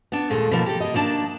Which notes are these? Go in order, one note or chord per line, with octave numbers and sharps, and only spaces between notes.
B3 D4
D#2 A#2 G#3 A3 F5
B2 D#3 F3 A#3
G4 A4
A#3 D#5
D#3 A#3 D4 D5 A5